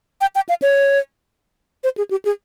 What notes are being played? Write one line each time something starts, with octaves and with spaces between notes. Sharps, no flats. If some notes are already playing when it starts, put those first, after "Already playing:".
G5
G5
F5
C#5
C5
G#4
G4
G#4